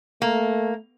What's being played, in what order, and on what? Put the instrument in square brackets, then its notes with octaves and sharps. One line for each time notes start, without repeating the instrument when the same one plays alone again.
[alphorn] A3 [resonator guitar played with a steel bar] A#3